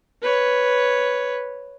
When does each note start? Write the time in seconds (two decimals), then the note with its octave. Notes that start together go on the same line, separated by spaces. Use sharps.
0.22 B4 C#5